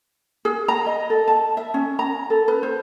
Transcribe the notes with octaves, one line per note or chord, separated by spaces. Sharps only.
G#4
A#5
D#5
A4
A5
E5
C#4
A#5
A4
B4
C5